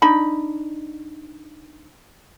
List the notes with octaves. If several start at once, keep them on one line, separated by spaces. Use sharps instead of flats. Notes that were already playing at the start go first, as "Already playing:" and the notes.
D4 D#4 B5